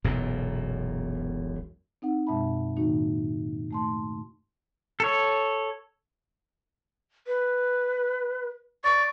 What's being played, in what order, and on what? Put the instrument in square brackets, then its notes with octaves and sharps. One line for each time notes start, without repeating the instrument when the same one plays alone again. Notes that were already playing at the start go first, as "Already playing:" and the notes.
[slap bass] E1 B1 F#2 A#2
[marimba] C4 D#4 F#5
F#2 B2 G#3 E5 A5 B5
A2 D#3 A#3 D#4 F#4
A3 A5 C6
[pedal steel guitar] A4 C#5
[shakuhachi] B4
[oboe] D5 [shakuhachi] C#6